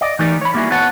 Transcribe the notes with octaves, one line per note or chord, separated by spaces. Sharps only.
D5 D#5
E3 A3 D#4 G4 A#4 D5
C#5 B5
G3 A#3 B3 E4 F#4 G#4
B3 F#4 B4 C#5 F#5 A5